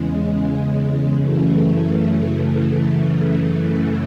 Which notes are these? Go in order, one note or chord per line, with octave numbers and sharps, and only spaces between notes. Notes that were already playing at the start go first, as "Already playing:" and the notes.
Already playing: E2 C#3 G#3
F#2 C#3 E3 A3